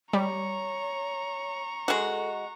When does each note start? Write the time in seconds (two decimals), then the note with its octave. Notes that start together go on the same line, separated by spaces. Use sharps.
0.13 G3 C#5 A#5 C#6
1.88 G#3 F#4 A4